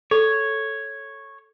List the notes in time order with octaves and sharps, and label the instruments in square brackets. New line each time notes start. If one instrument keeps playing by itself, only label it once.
[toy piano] A4 [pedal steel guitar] C#5